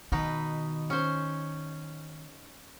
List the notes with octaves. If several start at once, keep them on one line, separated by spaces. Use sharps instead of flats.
B2 D#3 D#4 B4
C#4 C5